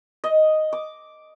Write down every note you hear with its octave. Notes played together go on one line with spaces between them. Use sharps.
D#5
D6